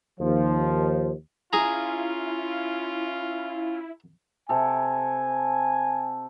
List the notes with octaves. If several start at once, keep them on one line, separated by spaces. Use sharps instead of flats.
D#2 F3
C#4 E4 F4 G#4 A#5
C3 A4 G#5